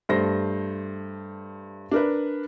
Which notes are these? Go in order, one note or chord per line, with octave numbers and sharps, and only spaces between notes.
G2 A3 C5 A#6
D4 A#4 B4